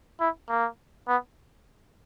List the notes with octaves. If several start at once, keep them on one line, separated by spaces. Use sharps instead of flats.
E4
A#3
B3